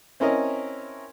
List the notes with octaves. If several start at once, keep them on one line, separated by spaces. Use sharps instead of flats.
C4 C#4 E4 A#4 D#5